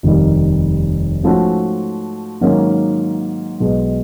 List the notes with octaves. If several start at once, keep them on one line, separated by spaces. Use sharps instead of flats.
F1 D#2 D#3 G3
G#2 F3 A3 C#4 F#4
G#2 D#3 F#3 A#3 C#4
B1 B2 G#3